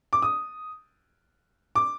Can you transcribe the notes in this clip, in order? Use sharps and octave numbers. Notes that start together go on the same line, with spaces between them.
D6
D#6
D6